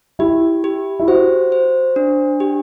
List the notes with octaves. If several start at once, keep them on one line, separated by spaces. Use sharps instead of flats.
E4 G4
G4
E4
F#4 C5
C5
D4
G4